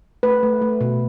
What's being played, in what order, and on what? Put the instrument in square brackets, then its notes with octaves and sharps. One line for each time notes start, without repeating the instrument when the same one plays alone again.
[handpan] A3 B4
A3
A3
B2